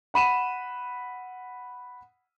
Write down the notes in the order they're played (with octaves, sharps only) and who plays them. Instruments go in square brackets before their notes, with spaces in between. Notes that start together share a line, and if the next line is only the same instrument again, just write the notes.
[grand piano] F#5 B5 D#7 E7